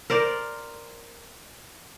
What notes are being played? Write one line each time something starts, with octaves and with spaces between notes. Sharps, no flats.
A#4 C5 D5